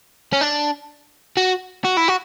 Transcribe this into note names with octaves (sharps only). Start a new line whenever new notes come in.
C#4
D4
F#4
F#4
E4
F#4